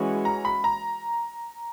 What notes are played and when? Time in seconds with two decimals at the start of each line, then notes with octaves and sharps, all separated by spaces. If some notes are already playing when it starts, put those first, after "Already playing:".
Already playing: E3 G#3 C#4 F#4
0.25 A#5
0.45 B5
0.64 A#5